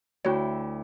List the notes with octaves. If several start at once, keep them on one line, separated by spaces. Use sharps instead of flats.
D2 E4 F#4 C#5 G5